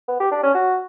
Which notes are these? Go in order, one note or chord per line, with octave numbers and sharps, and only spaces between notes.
B3
G4
D4
C#4
F#4